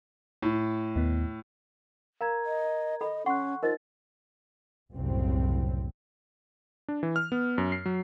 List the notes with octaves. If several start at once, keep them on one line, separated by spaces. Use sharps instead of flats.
A2
D#2 B3
A#4 F5 A#5 G#6
D#5
A4 D#5 B5
C#4 F#5 C6 C#6 F#6
D#4 F4 A#4 C5 D#5 A6
F#1 C2 F#2 A2 C4
D4
E3
F6
B3
F#2
C7
F#3